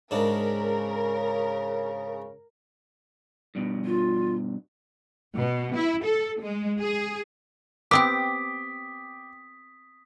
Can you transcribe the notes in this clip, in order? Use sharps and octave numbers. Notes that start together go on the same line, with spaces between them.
G#2 C#3 D4 A#4
G2 B2
F4
B2
E4
A4
G#3
G#4
B3 C4 G4 G5 D6 D#6 B6